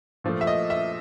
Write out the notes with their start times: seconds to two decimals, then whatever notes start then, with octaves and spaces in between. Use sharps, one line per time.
0.24 A#2 F3 A3
0.41 E5
0.47 D#5
0.70 E5